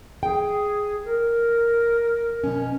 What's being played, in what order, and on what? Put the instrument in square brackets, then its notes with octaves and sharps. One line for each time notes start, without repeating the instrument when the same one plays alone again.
[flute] G#4 [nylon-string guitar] G5
[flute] A#4
[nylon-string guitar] B2 C#4